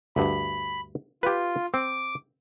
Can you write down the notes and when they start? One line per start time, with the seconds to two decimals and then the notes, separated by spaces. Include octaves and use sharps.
0.16 D2 G2 B5
1.23 F4 G4 B4
1.74 C4 D6